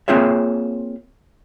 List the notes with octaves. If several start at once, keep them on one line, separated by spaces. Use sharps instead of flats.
A#3 C4 F4 G#4 C#5 E5